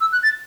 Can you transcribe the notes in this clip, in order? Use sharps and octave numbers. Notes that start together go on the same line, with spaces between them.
E6
F#6
A6